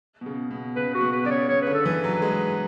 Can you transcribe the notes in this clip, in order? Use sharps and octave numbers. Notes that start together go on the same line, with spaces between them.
B2
C#3
B2
C#3 B4
F#4
B2
B4
C#3 D5
C#5
C#3 C#5
D3 B4
A4
E3 B4
F#3
G#3